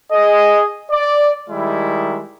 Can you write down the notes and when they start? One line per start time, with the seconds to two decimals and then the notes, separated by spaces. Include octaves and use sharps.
0.11 G#4 D#5
0.91 D5
1.49 D#3 G3 G#3 E4